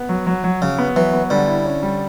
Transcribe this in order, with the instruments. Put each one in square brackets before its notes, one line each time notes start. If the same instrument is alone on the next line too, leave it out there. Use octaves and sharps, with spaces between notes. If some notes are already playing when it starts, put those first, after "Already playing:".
Already playing: [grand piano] B3
F#3
F#3
F#3
[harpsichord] C#3 [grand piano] F#3
[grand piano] B3
[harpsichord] E3 [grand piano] F#3
[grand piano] B3
[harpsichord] D3 [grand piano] G3
[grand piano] E4
C#4
G3